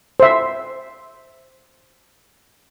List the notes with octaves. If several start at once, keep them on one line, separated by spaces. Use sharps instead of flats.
C5 E5